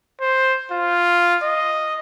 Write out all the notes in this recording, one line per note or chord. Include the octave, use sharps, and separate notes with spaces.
C5
F4
D#5